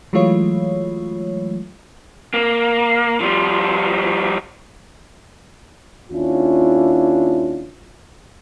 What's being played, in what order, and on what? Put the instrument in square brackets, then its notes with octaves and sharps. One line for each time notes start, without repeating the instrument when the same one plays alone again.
[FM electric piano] E3 F#3 G#3 A3 F4 C#5
[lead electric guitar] A#3
F3 G3
[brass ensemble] D#2 C#4 D4 E4 F4